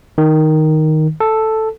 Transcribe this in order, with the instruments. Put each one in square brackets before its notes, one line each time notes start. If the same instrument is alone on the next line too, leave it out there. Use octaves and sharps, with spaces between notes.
[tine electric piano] D#3
A4